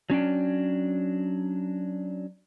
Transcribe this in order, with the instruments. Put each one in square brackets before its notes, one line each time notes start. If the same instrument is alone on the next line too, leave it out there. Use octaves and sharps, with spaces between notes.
[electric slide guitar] F#3 C#4 D4 G5